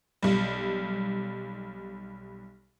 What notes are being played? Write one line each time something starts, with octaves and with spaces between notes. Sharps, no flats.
B1 G3